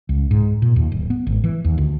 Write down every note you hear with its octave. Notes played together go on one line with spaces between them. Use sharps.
C#2
G#2
A#2
D#2
D1
B3
G#1
E3
D#2
D2